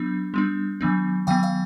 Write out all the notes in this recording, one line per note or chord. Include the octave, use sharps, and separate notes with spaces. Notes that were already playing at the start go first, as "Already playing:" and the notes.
Already playing: F#3 B3 D4
G3 B3 D4
D#3 F#3 B3 D4
D#3 F#3 B3 F5 G5
F5 G5